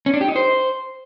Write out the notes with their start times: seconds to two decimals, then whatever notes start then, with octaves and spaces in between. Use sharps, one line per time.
0.06 C#4
0.14 D4
0.21 G4
0.28 D#4
0.36 C5